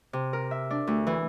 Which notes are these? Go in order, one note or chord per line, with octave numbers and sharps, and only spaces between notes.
C3
A#4
E5
D4
D2
E3